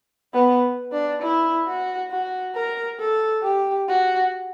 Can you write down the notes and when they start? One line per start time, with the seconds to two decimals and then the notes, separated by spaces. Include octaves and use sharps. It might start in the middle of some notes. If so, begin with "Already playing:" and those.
0.33 B3
0.93 D4
1.22 E4
1.67 F#4
2.11 F#4
2.55 A#4
3.00 A4
3.43 G4
3.88 F#4